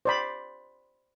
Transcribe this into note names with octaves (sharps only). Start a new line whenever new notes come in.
C5 D5 B5